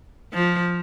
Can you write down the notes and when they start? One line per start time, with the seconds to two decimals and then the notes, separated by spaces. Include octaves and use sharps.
0.33 F3